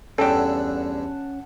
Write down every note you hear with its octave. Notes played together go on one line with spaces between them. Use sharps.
E2 G2 D3 C#4 A4 F#5 G5 A5